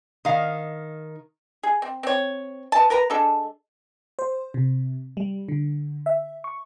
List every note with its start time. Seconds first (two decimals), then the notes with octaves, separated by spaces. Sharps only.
0.25 D#3 F5
1.63 G#4
1.82 C4
2.03 C4 C#5
2.72 B4 A5
2.90 A#4 B4 A#5
3.10 G#3 D4 A4
4.19 C5
4.54 C3
5.17 G3
5.49 D3
6.06 E5
6.44 C#6